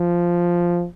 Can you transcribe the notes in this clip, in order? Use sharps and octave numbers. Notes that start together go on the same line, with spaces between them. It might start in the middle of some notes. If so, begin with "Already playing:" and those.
Already playing: F3